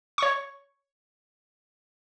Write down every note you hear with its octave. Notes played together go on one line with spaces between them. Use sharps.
C#5 C#6